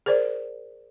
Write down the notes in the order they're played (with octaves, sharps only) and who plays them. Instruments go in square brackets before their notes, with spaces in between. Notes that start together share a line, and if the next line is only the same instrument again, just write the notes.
[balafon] G#4 A#4 C5 D5